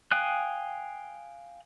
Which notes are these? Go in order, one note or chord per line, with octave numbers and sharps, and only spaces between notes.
F5 G5 G#5 D#6 F#6